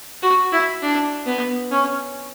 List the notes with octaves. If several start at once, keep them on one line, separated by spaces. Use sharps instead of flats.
F#4
E4
D4
B3
C#4